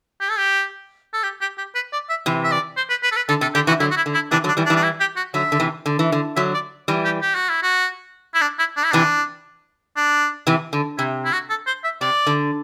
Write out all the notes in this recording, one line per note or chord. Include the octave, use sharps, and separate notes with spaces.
G4
A4
G4
A4
G4
G4
G4
B4
D5
E5
C3 E3
E5
D5
C5
B4
B4
A4
B4
D3 A4
C3 A4
D3 G4
C3 E3 F#4
D3 F#3 E4
F#4
E4
D3
E4
C3 E3 D4
D3 F#3
D4
E3 G3
D4
E3 G3
D4
E4
G4
F#4
D3 F#3 E5
D3
C3 E3
D3
E3
D3
D3 F#3 E5
D5
E3 G3
G4
G4
F#4
E4
F#4
E4
D4
E4
D4
E4
C3 E3 D4
D4
C3 E3
D3
C3 E4
E4
F#4
A4
C5
E5
C3 D5
D3